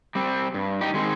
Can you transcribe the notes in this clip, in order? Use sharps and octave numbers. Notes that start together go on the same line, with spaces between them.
G3 C4
G2
D#4 G4
D#3 G#3 C4